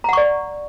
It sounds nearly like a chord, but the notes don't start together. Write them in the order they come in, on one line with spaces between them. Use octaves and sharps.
A#5 F#5 C#6 D5